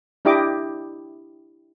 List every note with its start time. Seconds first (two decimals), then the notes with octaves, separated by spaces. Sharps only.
0.25 D4 E4 G4 D#5 D6